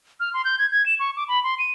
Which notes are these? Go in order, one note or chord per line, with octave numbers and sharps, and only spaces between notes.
F6
C6
G6
G#6
G#6
E7
C#6
D6
B5
C6
D#7